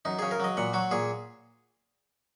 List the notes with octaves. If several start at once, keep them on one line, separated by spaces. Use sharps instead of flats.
F#2 D#4
C#3 G#4
A#4
F#3 D#5
A#2 F#5
F#3 F#4
A#2 G#4